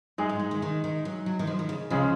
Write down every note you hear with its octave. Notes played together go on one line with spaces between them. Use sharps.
F#2 G#3 D#4 G#4
G#2
G#2
D#3
D#3
D#3
F#3
F#3
D#3
F3
D#3
C#3
C#3 F3 G#3 C#4 F4 G#4